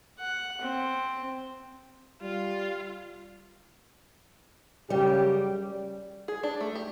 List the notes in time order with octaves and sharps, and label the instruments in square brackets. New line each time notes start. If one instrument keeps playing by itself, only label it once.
[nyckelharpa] F#5
C4
[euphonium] G3 [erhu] F4
[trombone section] F#2 C#3 G4 [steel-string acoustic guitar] G3
[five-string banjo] G#4
D4
A3
G4